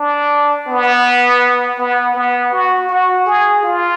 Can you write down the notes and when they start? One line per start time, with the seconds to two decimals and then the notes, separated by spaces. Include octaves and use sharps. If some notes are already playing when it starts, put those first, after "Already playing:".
Already playing: D4
0.68 B3
1.78 B3
2.15 B3
2.52 F#4
2.89 F#4
3.26 G#4
3.64 F4